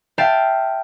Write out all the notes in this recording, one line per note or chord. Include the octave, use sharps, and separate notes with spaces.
E5 F5 G5 A5